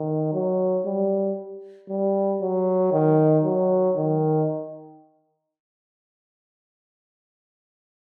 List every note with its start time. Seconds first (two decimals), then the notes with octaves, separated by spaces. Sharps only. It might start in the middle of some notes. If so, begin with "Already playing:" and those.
Already playing: D#3
0.33 F#3
0.85 G3
1.89 G3
2.41 F#3
2.92 D#3
3.44 F#3
3.96 D#3